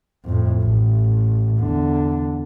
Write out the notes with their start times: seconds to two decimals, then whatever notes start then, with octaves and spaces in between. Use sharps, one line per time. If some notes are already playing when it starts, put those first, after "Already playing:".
0.25 F2 A2
0.62 A1
1.59 E2 D3